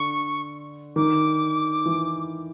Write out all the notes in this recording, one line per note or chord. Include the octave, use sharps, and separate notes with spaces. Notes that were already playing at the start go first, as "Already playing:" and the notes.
Already playing: D3 C#6
D#3 D6
E3